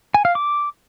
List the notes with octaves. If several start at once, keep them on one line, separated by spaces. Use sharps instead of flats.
G#5
F5
D6